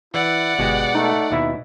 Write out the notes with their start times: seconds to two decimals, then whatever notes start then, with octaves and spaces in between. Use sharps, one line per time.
0.14 E3 E4 D5 F#5
0.59 G1 B2 G#3 G4
0.95 A3 D#4
1.31 D#2 B2 E4 E5